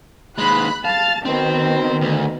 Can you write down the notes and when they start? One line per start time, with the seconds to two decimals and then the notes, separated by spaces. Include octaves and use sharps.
0.38 D#2 G#3 B5 F#6
0.85 F5 A5 A6
1.25 B2 D#3 C4
2.01 D2